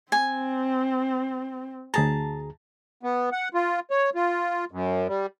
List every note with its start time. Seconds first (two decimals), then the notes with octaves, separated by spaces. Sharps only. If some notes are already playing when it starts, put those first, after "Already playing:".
0.12 C4 G#5
1.94 D2 G#4 A5 A#5
3.03 B3
3.32 F#5
3.54 F4
3.91 C#5
4.15 F4
4.71 F#2
5.08 G3